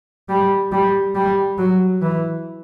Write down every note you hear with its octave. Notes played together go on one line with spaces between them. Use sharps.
G3
G3
G3
F#3
E3